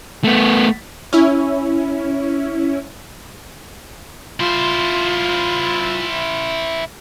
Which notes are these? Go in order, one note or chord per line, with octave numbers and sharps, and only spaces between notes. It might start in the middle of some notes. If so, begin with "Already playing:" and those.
A3 B3
C#4 E4
E4 F4 C5